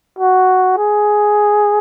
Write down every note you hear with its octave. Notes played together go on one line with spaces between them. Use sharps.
F#4
G#4